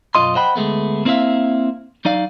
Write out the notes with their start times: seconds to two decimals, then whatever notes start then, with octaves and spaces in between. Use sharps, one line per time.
0.15 B1 F#2 F4 D#5 C6
0.35 C5 D#5 F#5 G5 B5
0.56 D2 G#3 A3 B3
1.05 A#3 C4 E4 C5 E5 F5
2.05 F#3 D#4 D5 F5